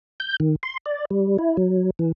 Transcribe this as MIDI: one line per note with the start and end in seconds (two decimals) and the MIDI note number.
0.20 0.36 91
0.40 0.55 51
0.63 0.77 84
0.86 1.05 74
1.11 1.37 55
1.38 1.57 64
1.57 1.90 54
1.99 2.12 52